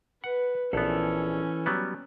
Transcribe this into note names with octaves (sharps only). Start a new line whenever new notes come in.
B4 F#5
A#1 E3 B3 C#4 A4
F#3 G3 B3